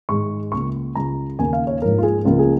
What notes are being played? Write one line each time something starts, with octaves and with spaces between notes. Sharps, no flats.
G#2 D#3 G#3 C#6
C#2 C#3 A#3 C#6
C#2 C#3 G#3 A#5
D#2 C#3 A#3 G#5
F5
C#5
G#2 F3 A#3 A#4
F4
G#4
C#2 C#3 F3 A#3 F4
G#4